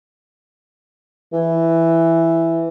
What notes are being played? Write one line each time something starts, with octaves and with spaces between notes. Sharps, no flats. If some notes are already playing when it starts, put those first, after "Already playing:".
E3